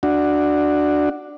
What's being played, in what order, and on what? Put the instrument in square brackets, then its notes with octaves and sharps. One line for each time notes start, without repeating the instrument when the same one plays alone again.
[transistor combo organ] D4 F#4